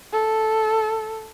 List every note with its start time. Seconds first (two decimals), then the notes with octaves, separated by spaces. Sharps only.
0.12 A4